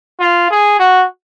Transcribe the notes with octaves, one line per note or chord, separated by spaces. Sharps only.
F4
G#4
F#4